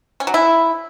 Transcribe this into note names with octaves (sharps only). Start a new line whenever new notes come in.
C#4
F#3
E4